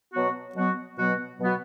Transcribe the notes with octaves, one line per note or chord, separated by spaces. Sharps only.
B2 F#3 B3 F#4
B2 F#3 B3 F#4
B2 F#3 B3 F#4
B2 F#3 B3 F#4